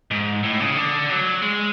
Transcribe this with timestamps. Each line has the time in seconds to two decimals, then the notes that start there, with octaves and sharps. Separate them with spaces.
0.11 G#2
0.43 A2
0.60 C#3
0.77 D3
1.10 F#3
1.42 G#3